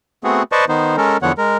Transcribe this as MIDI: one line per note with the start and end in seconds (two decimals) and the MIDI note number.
0.24 0.43 57
0.24 0.43 59
0.24 0.43 60
0.24 0.43 66
0.24 0.43 68
0.52 0.65 71
0.52 0.65 72
0.52 0.65 74
0.52 0.65 75
0.52 0.65 81
0.52 0.65 85
0.69 0.96 51
0.69 0.96 59
0.69 0.96 63
0.69 0.96 72
0.97 1.17 56
0.97 1.17 61
0.97 1.17 69
0.97 1.17 70
1.22 1.32 40
1.22 1.32 50
1.22 1.32 53
1.22 1.32 59
1.22 1.32 73
1.22 1.32 78
1.38 1.57 56
1.38 1.57 70